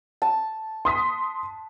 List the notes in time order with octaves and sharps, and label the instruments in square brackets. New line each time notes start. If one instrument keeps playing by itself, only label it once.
[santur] A5
[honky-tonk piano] C6 D#6 B6